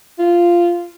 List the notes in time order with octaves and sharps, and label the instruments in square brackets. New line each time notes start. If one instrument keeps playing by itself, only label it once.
[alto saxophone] F4